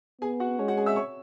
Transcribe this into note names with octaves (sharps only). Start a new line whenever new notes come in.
B3 G#4 G#5
F#4 F#5
G#3 C#4 C#5
F#4 F#5
G#4 G#5
E5 E6
C#5 C#6